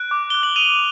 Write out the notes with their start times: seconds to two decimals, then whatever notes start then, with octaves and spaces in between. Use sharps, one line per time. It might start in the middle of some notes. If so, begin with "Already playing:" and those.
Already playing: F#6 D7
0.11 D6
0.30 F#6 G7
0.43 F#7
0.56 D#6 D#7 F7